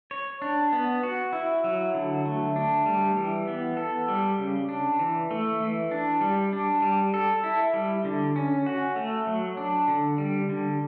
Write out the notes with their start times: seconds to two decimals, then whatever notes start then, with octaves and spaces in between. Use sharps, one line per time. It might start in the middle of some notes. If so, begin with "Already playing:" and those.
0.11 C#5
0.42 D4
0.73 B3
1.03 F#4
1.33 E4
1.64 F#3
1.94 D3
2.25 A3
2.56 D4
2.86 G3
3.16 E3
3.48 B3
3.77 A4
4.08 G3
4.39 C#3
4.69 D4
4.99 E3
5.31 A3
5.61 E3
5.91 D4
6.21 G3
6.53 D4
6.82 G3
7.14 A4
7.44 E4
7.74 G3
8.05 D3
8.36 C#4
8.66 F#4
8.96 A3
9.27 F#3
9.57 D4
9.88 D3
10.18 G3
10.49 D3